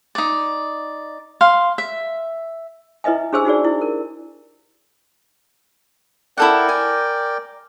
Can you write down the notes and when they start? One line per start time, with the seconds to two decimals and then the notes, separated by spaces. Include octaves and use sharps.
0.15 D#4 D5
1.41 F5 C6
1.78 E5
3.04 E4 B4 D#5 E5 G#5
3.33 D4 G4 G#4 C5 G#5 E6
3.45 D#4 F#4 G#4 D5
3.65 E4
3.81 A#4
6.38 E4 A4 A#4 D5 F#5 G5
6.69 G#5